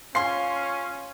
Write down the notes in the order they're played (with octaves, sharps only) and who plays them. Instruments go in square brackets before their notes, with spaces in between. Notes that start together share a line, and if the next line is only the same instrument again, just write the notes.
[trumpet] C#4 [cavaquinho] F4 G#5 [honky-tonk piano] C6 C7